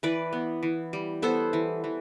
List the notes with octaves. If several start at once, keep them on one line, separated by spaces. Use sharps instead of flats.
E3 B4 D5
B3
E3
G3
B3 A4 C5
E3
E3